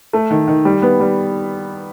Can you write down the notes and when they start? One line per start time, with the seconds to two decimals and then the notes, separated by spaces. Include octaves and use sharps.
0.13 A3
0.31 D#3
0.48 D#3
0.65 G3
0.82 B3
1.00 G3